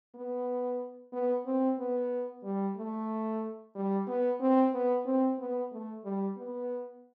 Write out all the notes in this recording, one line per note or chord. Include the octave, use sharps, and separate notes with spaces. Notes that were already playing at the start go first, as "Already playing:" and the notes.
B3
B3
C4
B3
G3
A3
G3
B3
C4
B3
C4
B3
A3
G3
B3